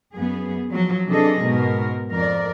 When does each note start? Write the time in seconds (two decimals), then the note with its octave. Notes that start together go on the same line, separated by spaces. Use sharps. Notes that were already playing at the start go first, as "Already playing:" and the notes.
0.14 F#2 B3 G#4
0.70 F3 F#3
1.07 C3 E3 D4 G#4 A4 D#5
1.43 G#2 B2 G#3 A#4
2.10 F2 A#4 D5